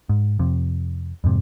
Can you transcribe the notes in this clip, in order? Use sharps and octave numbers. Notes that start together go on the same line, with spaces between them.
G#2
F2 C3
F2 G#2 C3